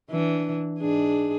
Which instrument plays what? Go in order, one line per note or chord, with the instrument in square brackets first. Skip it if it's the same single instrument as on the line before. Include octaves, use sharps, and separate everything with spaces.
[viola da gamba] E3 D4
G#2 D4 G#4